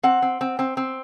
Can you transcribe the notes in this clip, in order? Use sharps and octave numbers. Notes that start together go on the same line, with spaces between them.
C4 F#5
C4
C4
C4
C4